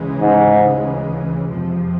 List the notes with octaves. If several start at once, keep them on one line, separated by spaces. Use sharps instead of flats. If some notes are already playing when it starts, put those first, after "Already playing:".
Already playing: D2 C#3 E3 G#3
G#2
F2 C3 F3